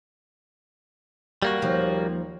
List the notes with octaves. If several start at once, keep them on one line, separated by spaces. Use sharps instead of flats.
G3 A#3 F#4
D#2 F3